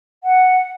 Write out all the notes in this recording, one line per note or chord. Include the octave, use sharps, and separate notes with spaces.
F#5